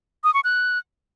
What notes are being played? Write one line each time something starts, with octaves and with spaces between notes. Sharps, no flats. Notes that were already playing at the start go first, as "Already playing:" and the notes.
D#6
C#6
F#6